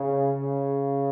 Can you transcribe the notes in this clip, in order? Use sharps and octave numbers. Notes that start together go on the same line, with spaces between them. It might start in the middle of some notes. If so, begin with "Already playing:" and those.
Already playing: C#3
C#3